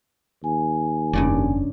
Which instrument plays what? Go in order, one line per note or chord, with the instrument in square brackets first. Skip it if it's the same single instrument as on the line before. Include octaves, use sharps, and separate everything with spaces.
[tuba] D#2 [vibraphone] G#5
[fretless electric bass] F1 [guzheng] G2 C#3 D5